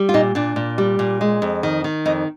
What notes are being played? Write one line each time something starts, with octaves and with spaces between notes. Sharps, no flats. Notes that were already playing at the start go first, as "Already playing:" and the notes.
Already playing: G3
F4
A#2 D#4
A#2 D4
A#2
G3
A#2
G#3
F2
D#3
D#3
F2 D#4